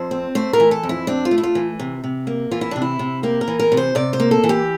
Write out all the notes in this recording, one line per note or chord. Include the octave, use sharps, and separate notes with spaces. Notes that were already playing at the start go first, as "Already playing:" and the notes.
Already playing: F2 C5
C4
A3 C5
A#4
E3
A4
F2
E4
C4 D4
F4
A3
E4
F4
E3
C3
C3
A#3
E3 F4
E4
C3 D4
E4
C3
A#3 G4
A#4
E3
A#4
C3
C5
C3 D5
C5
A#3
A4
E3
G4